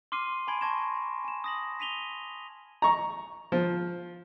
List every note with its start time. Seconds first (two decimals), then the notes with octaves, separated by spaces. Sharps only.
0.12 C6 D6 F6 C7 D#7
0.48 G#5 A5 B5 C6 G#6 D7
0.61 A5 C#6 G#6 A#6 E7
1.24 G#5 E7
1.44 D#6 A#6 F#7
1.80 B6 D#7 F7 G7
2.82 A#5 C#6
3.52 F3